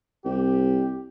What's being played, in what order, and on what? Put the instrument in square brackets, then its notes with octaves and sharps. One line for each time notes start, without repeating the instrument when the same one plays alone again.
[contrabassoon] C2 [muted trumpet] G4